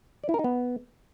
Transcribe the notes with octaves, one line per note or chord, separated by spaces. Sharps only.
D5
E4
A#4
D#4
B3